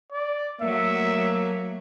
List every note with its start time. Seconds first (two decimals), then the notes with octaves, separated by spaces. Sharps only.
0.12 D5
0.61 F#3 A3 A#3 E5